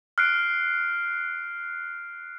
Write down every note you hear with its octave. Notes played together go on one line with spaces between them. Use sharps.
F6 F#6 C7 D7